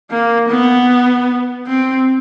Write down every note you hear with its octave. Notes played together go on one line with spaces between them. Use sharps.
A#3
B3
C4